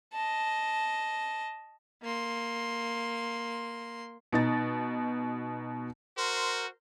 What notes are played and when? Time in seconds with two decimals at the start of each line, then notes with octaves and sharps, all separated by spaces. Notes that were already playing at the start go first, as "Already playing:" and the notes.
0.13 D#5 A5
2.02 A#3 C6
4.33 B2 D#4 A6
6.18 F#4 A#4 C5 C6